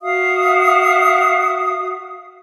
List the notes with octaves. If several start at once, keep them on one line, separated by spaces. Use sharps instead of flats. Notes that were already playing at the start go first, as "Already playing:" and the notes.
F#4 E5 F5 D#6